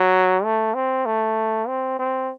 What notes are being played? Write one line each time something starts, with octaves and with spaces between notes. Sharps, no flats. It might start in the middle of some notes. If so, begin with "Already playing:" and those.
Already playing: F#3
A3
C4
A3
C4
C4